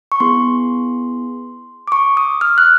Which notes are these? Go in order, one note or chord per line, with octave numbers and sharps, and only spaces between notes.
C#6
B3 E4 G#4 C6
D6
C#6
D#6
F6
F#6